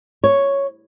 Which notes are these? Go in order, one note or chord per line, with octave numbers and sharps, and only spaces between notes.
C#5